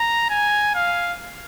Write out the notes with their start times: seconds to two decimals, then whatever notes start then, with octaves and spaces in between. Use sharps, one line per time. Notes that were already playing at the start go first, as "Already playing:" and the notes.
Already playing: A#5
0.30 G#5
0.75 F5